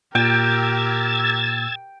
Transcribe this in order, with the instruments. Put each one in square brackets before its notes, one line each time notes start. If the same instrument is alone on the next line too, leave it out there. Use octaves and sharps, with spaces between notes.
[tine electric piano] A#2 [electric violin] G4 A#4 [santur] G5 [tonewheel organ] E6 G#6 A6